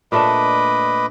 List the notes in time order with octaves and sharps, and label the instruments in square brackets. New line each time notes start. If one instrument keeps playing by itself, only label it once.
[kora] A#2 A3 D4 [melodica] B4 D#5 D6